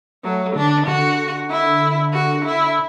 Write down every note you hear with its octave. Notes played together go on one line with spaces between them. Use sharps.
F#3 A3
D3 D4
D3 F#4
E4
F#4
E4